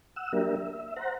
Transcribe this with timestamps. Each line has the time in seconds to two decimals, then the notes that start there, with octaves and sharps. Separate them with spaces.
0.16 F#5 E6
0.33 F#3 A#3 D4 G4 A#4 E5
0.56 E5
0.96 C5 F#5 A#5